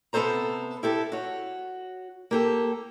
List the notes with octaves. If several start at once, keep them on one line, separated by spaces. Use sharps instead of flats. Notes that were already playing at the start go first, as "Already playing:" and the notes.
C3 B3 G#4 A4 C5 A#5
E4 G4 A4
F#4 C#5
A#3 G4 A4